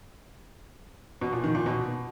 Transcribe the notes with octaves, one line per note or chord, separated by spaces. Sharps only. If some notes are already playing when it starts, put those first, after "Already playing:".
B2
A#2
D#3
A#2
B2